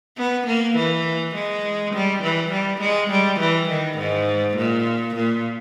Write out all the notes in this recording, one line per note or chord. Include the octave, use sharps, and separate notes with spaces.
B3
A#3
E3
G#3
G3
E3
G3
G#3
G3
E3
D#3
G#2
A#2
A#2